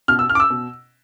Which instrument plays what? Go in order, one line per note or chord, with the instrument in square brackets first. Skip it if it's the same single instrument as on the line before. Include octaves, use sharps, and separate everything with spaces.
[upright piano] B2 F6
E6
F6
D6
E6
B2